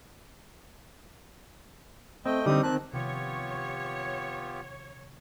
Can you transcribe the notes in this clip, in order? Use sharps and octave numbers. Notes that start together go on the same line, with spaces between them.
A3 C4 D#5 G5
D3 G3 C4 D#4 G4 D#6
D#3 C4 A5 F#6
C3 D#3 F3 B3 F4 G4 C#5